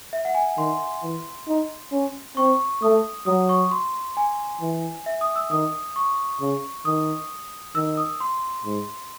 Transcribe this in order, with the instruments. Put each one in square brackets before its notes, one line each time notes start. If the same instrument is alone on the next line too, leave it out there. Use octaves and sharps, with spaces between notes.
[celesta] E5
F#5
G#5
[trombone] D#3 [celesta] C6
[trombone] E3
D#4
C#4
[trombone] C4 [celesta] C#6
[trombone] A3 [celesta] D#6
[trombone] F#3 [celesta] D#6
[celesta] C#6
C6
G#5
[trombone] E3
[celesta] E5
D#6
E6
[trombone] D#3 [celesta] D#6
[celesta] C#6
[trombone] C#3
[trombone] D#3 [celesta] D#6
[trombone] D#3 [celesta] E6
[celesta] D#6
C6
[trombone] G#2